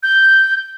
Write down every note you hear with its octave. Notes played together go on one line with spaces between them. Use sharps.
G6